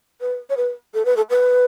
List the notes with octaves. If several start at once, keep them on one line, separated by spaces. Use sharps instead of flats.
B4
C#5
B4
A4
B4
A4
B4